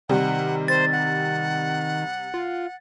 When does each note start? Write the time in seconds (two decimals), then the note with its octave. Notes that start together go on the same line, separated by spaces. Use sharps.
0.09 C3 D#3 G3 F#5
0.68 C5 A6
0.92 F#5
2.34 F4